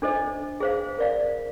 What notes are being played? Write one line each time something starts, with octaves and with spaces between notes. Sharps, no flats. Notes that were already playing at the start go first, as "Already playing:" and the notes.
D4 A4 C5 D#5
G#4 C5 F5
A#4 D5 F5